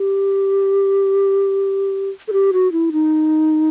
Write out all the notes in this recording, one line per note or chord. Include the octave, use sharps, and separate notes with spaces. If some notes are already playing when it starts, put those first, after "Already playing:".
Already playing: G4
A4
G4
F#4
E4
D#4